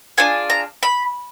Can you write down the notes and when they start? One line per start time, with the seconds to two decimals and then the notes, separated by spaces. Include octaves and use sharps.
0.18 D4 F4 G#4 G#5
0.50 A#5
0.83 B5